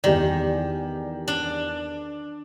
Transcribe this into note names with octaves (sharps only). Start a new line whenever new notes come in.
E2 D#3 G4 D5
D4